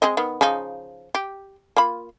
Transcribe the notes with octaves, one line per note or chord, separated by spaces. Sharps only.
G#3 C4 D#5
D#3 B3
C#3 F3 D#4
G4
A#3 F4 B5